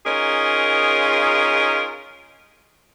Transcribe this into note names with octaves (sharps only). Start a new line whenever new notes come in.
C#4 D#4 F4 G#4 A#4